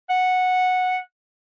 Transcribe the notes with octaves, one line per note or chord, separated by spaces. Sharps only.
F#5